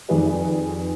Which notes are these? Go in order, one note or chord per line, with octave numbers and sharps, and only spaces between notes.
F2 D#3 G4 G#4 B4 D5